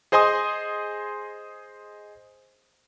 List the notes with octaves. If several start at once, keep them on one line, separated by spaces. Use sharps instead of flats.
G#4 C5 D#5 G#5 C6 D#6